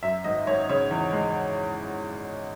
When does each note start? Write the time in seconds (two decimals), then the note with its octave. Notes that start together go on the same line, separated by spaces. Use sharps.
0.03 F#2 E5
0.24 G#1 D#5
0.47 G#1 C#5
0.69 C#3 C#5
0.91 E2
1.13 G#3